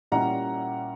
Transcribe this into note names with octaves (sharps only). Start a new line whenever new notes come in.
A#2 G3 C#4 E4 F#5 A#5